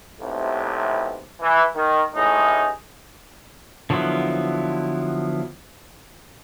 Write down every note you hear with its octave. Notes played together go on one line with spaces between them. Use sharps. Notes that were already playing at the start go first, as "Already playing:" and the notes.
B1 A2 C3
E3
D#3
A1 A2 D#4 G#4
D3 F3 F#3 B3 E4